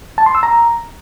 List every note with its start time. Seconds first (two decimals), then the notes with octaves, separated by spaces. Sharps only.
0.18 A5
0.26 C6
0.35 E6
0.43 A#5